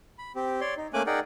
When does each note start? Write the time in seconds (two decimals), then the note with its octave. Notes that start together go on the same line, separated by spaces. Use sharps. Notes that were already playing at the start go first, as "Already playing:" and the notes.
0.18 B5
0.36 C4 G4
0.61 C#5 D5 C6
0.77 D#4
0.94 A3 A#3 C#4 G#5 D6 F#6
1.06 D#4 G#4 A#4 D5 F#5 G5